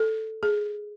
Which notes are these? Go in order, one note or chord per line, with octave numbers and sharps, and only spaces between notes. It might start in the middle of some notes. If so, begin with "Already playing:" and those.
Already playing: A4
G#4